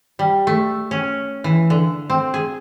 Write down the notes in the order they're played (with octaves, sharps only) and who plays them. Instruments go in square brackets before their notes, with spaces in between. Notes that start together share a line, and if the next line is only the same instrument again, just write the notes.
[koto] G3
A3
C#4
E3
D3
C4
G#4